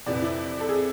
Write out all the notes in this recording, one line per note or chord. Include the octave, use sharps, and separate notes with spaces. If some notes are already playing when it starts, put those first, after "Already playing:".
F2 C3 E3 D5
E4
A4
G#4